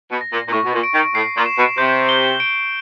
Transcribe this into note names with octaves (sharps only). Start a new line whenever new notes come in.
B2
A#6
A#2
A#2
A2 C#6
B2
A#2
D7
D#3
A2 C7
A#2
E7
B2
C3 G6
G7
D7